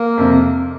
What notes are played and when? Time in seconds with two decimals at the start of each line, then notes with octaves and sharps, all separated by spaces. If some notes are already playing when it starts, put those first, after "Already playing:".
Already playing: A#3
0.18 F2 C3